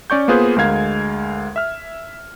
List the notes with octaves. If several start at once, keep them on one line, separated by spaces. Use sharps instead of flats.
C#4 D5 C#6 G6
A#3 B3 F4 G#4 B4 C5
D2 G#3 A#4 F5 G#6
E5 F6